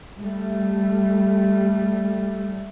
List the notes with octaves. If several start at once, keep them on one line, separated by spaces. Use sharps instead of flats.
G3 A3